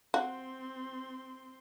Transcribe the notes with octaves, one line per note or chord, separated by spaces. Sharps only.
C4 F#4 C6